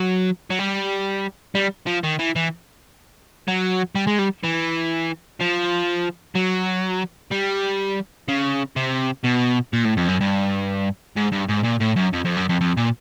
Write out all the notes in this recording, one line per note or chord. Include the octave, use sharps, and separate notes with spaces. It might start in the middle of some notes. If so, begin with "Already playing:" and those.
Already playing: F#3
F#3
G3
G3
F3
D#3
E3
E3
F#3
G3
G#3
G3
E3
F3
F#3
G3
C#3
C3
B2
A#2
A2
F2
F#2
G2
G#2
G2
G#2
A#2
A2
F#2
F2
F2
F#2
F2
F2
A#2